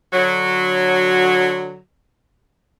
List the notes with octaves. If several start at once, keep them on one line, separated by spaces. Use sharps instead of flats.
D3 F#3